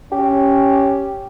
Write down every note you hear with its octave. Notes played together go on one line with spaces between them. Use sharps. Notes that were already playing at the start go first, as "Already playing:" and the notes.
C#4 G4